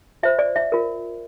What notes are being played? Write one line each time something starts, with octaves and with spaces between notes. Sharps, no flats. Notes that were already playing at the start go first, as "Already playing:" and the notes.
F4 C5 E5
D5
E5
F4 A#4